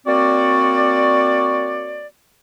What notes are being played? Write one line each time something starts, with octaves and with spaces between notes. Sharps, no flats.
A#3 C4 F#4 C#5 D5